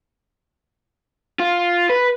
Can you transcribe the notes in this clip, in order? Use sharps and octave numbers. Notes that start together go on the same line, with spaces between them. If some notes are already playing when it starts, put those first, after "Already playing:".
F4
B4